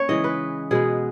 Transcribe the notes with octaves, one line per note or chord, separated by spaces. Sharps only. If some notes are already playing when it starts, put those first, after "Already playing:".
Already playing: A#3 C#4 C#5
C#3 E3 G#3 D#5
B4
B2 G#3 B3 G#4